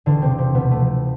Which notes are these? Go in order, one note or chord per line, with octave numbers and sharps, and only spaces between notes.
E1 D3 D4
C3 C4
D3
C3 C4
D2 B2 B3
A3
F3
A3